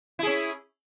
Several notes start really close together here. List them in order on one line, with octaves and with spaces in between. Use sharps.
E4 G#4 C#4